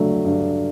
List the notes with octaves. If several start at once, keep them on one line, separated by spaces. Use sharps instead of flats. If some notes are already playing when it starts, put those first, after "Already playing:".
Already playing: G2 F#3 A3
G2